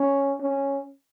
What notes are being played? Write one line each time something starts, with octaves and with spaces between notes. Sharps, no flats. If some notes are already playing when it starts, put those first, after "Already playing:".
Already playing: C#4
C#4